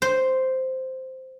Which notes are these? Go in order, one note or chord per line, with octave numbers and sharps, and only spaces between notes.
C5